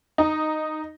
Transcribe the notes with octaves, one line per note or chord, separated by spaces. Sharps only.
D#4